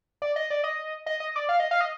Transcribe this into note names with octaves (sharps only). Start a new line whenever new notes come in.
D5
D#5
D5
D#5
D#5
D#5
D5
F5
D#5
F5
D#5